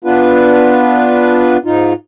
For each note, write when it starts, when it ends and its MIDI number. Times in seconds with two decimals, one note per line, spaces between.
0.04 1.57 59
0.04 1.57 62
0.04 1.57 65
0.04 1.57 71
1.65 1.93 44
1.65 1.93 63
1.65 1.93 65